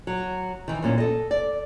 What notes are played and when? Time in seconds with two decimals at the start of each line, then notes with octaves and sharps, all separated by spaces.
0.07 F#3
0.68 D#3 E3
0.82 F#2 A#2 C#4
0.98 A4 D#5
1.31 D5